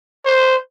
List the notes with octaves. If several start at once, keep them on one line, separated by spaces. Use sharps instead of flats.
C5